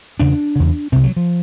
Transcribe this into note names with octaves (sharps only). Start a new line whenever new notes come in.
E2 C#3 D4
E2 C#3
C2 C3 C4
F#3
F3